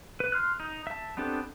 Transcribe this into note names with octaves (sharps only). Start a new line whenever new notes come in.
B4
C6 F6 F#6
D#4
E5 A5
B3 C4 D4 G4 A4